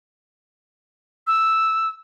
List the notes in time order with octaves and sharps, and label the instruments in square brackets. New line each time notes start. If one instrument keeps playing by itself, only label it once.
[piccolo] E6